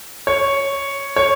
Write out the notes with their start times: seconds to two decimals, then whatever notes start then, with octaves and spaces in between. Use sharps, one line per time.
0.27 C#5
1.16 C#5